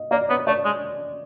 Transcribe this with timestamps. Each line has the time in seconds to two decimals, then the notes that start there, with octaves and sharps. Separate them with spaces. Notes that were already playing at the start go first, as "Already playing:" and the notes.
Already playing: D#5
0.11 A#3 D5
0.29 B3 C#5
0.47 A3 D5
0.65 G#3